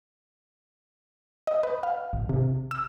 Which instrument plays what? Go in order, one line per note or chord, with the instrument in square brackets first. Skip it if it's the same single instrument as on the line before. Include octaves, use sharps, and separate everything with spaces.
[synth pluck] D#5
B4
F5
G#1
C3
E6